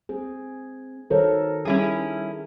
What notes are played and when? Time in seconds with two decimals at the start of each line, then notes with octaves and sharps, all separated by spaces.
0.09 C4 G#4
1.10 D#3 F#4 A4 A#4 C5 C#5
1.65 G3 C#4 E4 G#4